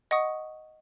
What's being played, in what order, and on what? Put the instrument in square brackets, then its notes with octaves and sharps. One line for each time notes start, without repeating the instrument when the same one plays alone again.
[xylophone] D#5 F#5 C#6 D#6